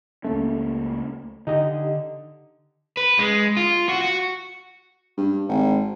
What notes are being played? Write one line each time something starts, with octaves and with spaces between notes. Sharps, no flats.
C#2 A3 A#3 C#4
D3 D#4 G4 D#5
B4
G#3
F4
F#4
F#4
G2
G#1